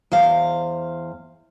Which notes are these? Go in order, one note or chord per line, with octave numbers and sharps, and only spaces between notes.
E2 C5 F5